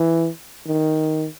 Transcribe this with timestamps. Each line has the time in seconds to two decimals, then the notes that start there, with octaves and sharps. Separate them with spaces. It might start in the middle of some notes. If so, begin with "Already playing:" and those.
Already playing: E3
0.67 D#3